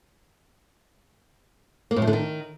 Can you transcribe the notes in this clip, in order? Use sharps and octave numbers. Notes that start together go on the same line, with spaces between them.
A#3
A2
F3
D3
D#3